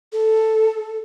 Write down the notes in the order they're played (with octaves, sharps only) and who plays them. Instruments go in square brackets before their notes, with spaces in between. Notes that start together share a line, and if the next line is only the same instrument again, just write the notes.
[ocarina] A4